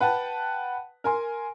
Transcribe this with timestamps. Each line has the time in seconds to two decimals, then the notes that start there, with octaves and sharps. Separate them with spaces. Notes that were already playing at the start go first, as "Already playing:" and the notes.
0.01 B4 F#5 G5 A5
1.04 A#4 G#5 C6